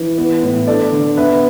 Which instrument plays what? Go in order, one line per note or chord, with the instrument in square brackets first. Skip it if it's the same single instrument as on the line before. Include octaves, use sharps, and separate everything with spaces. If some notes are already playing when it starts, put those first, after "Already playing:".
Already playing: [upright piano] E3 B4
B3
A2
D4 A4 D5
D3
B3 B4 E5